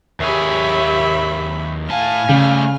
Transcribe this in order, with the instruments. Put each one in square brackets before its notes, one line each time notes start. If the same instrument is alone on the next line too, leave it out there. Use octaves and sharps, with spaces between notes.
[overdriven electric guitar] D#2 G#4 [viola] G4 C#5 [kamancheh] E5 B5
[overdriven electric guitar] A2 A5 [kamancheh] F5 F6 [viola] G#5
[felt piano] C#3 [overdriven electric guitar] G3 A3